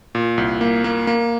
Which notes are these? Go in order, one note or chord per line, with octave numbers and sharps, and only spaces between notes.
A#2
C2
A#3
A#3
A#3